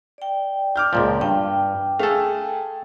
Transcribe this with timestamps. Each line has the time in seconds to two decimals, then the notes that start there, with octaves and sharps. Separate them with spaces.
0.18 D5 G5
0.76 D6 F6 G6
0.93 C#2 A#2 F3 D5
1.21 G2 G5
2.00 A3 G#4 A4 F5